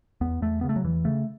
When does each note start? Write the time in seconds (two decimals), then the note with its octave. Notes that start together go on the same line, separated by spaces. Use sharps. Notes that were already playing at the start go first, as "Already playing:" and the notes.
0.21 E2 B3
0.42 E2 A3
0.61 C#3 B3
0.69 A3
0.76 F#3
0.84 E2 E3
1.04 C#3 A3